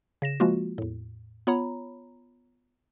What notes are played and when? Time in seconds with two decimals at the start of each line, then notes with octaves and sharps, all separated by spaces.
0.22 C#3 A#6 E7
0.40 F3 G#3 A#3 F4 F#4
0.78 E2 A2
1.47 B3 F4 C#5 A#5 B5